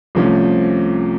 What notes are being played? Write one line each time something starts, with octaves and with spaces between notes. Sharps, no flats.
C2 C3 F3 A3 C#4